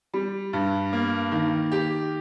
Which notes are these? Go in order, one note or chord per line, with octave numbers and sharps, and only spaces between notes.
G3
G2
A#3
D#3
G4